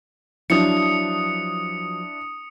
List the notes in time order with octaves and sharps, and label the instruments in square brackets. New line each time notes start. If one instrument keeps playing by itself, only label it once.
[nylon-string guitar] F3 F#3 [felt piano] D4 E4 [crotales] D#6 C#7